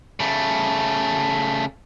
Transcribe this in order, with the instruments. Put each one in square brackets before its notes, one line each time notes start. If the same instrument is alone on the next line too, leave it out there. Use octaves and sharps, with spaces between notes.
[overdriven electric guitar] C#3 A3